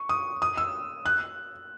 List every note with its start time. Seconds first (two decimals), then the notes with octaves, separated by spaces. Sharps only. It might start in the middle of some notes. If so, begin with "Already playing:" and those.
Already playing: C#6
0.09 D#6
0.42 D#6
0.57 E6
1.06 F#6